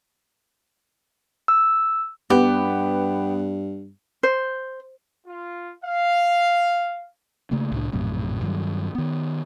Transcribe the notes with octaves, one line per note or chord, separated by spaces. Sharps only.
E6
G2 B3 G4
C5
F4
F5
C#3 A3 A#3
C2 A2 D4
A#1 F#2 A2 C3
G2 D#3 E3 F#3
D#3 B3